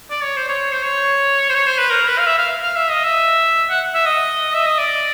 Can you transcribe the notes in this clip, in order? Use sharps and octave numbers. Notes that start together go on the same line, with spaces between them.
D5
C#5
C5
C#5
C5
C#5
C5
C#5
C5
B4
A#4
B4
F5
E5
F5
F5
E5
D#5
E5
F#5
E5
D#5
E5
D#5
D5